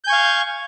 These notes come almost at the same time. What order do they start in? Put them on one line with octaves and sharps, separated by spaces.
G6 G#5 C#6 F5